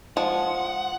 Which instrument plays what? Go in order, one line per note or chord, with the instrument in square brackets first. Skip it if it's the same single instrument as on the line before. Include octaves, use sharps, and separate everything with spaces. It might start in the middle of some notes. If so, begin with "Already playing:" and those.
[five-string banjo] F3 G#3 [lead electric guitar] F#5